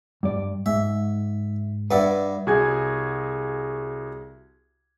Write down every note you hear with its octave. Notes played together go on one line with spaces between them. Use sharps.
G2 D5
G#2 E5
G2 B4 D5 E5 F#5
C2 F#4 G#4 G#5 G#6